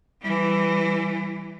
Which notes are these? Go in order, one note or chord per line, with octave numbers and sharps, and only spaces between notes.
E3 G3